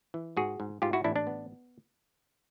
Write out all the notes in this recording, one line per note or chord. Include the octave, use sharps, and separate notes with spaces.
E3
G#2 F#4 G#4
G#2
G#2 F4 G4
E4 F#4
A1 D4 E4
D4
B3